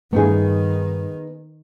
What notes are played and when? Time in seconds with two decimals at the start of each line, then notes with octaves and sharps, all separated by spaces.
0.13 G2 D#3 A3 B3 D#4 G#4